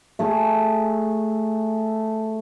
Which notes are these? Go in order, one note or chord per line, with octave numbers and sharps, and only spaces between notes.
A3 G#4